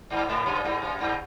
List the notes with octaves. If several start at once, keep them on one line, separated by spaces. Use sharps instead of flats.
G2
G#2
F#2
G2
F#2
G2